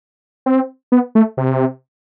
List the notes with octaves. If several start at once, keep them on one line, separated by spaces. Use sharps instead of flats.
C4
B3
A3
C3